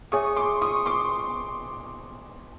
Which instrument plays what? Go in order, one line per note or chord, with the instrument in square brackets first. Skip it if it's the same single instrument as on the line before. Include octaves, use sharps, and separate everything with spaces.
[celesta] G#4 C#5 E5 G#5 [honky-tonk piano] C#6 D#6
[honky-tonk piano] C6 D6
C#6 D#6
C6 D6